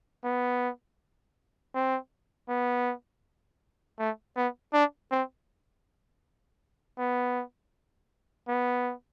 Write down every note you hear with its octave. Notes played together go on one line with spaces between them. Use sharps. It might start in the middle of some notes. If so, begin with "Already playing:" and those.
B3
C4
B3
A3
B3
D4
C4
B3
B3